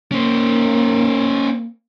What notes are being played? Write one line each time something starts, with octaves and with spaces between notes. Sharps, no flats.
A#3 C#4 C5